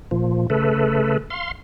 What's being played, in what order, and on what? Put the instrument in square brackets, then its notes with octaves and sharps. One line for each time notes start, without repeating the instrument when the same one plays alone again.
[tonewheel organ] A#2 F3
C#3 A3 A4 B4
F5 C6